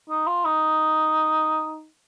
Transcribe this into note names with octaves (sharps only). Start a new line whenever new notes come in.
D#4
F4
D#4